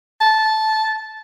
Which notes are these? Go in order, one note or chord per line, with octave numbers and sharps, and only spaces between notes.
A5